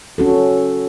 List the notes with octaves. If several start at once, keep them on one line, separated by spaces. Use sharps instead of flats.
C#4 F#4 A4